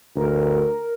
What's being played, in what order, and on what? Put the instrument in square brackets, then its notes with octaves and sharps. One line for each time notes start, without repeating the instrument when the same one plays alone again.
[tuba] D2 [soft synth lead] A#4